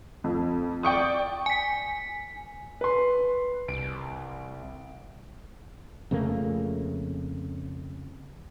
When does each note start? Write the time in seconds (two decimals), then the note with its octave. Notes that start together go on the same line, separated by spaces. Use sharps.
0.24 F2
0.83 D5 G5 C#6 D#6
1.46 G#5 B6
2.81 B4 C6
3.68 C2 D7
6.11 F2 C#3 A3 A#3